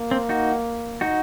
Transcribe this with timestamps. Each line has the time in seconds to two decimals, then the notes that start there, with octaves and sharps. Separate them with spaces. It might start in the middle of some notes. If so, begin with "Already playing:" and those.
Already playing: A#3
0.11 C4
0.29 D#4 F#4
1.01 D#4 F#4